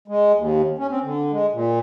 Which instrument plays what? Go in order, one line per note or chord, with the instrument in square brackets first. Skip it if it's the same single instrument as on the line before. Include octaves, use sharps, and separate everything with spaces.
[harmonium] G#3
D#2
C#4
C4
D3
G#3
A#2